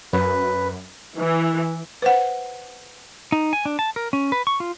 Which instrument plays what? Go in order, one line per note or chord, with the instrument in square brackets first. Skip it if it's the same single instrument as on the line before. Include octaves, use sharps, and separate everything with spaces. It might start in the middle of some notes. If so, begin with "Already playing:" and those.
[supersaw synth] F#2 [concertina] B4
[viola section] E3
[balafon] B4 C5 F#5
[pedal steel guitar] D#4
G#5
D4
A5
A#4
C#4
B4
C#6
F4